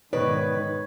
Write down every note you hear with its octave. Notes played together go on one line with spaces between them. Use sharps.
G#2 B2 D#3 D#4 B4 C#5 D5